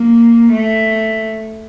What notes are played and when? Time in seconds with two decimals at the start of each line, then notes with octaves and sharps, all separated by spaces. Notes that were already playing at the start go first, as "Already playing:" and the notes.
Already playing: A#3
0.51 A3